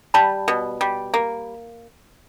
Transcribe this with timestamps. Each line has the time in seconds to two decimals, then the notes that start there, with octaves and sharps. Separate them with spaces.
0.14 G3 A5 B5
0.48 B2
0.81 G3
1.14 A#3